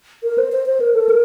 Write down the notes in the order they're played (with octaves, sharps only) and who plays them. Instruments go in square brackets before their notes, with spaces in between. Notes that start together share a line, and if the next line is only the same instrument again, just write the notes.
[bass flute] A#4
C5
C5
C5
A#4
A4
A#4